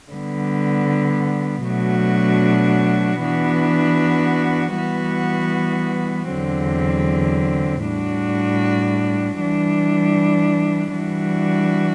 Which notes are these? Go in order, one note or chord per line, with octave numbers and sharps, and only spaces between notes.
D3 G3 B3
B2 F#3 A3 D4 F#4
E3 B3 D4 F#4
E3 G3 B3 F#4
E2 D3 F#3 C4
A2 G3 D4 F#4
E3 G3 D4
E3 G3 D4 F#4